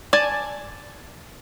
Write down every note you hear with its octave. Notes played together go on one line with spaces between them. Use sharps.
D5 G#5 A5